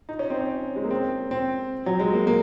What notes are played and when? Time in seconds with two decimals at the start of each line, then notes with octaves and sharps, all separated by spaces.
0.09 D#4
0.19 C#4
0.30 C4
0.41 C#4
0.76 G#3
0.84 A#3
0.91 C4
1.31 C4
1.86 F#3
2.00 G#3
2.13 A#3
2.27 A#3